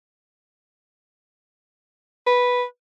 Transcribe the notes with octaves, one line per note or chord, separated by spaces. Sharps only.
B4